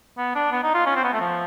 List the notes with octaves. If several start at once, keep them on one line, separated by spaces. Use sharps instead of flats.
B3
D4
B3
D#4
F4
C#4
C4
B3
A3
F3